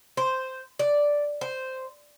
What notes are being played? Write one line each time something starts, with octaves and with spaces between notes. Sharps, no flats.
C5
D5
C5